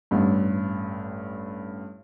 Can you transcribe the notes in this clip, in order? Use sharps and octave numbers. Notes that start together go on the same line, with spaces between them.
A1 G2